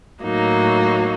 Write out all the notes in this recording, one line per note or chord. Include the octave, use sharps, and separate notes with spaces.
A2 F#3 A#3 D#4